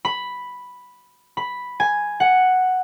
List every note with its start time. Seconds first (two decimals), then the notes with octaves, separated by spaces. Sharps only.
0.05 B5
1.37 B5
1.80 G#5
2.20 F#5